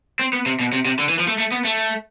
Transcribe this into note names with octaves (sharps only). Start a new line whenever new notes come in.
C4
B3
C3
B2
C3
C3
D3
E3
F3
A3
A3
B3
A3